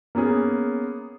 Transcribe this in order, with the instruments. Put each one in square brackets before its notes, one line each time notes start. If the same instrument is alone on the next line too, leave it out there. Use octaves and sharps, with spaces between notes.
[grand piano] A#3 B3 C#4 G#4